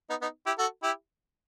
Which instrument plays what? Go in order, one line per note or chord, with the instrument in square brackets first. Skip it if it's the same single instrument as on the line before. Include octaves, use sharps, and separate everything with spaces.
[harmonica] B3 D#4
B3 D#4
E4 G4
F#4 A4
E4 G4